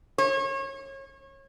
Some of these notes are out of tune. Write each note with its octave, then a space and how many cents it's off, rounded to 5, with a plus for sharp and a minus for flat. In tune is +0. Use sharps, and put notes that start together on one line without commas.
C#5 -30